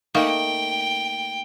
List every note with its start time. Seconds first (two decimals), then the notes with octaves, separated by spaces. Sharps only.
0.15 A3 A#3 D#4 G5